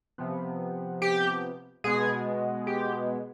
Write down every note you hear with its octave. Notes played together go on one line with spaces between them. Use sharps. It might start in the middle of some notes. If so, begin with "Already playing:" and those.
C3 F3 B3
G4
B2 G#3 B3 G#4
G4